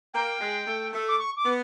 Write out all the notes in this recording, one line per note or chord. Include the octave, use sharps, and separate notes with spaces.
A#3 G5
G#3
A3
A3
D6
C#6
D6
B3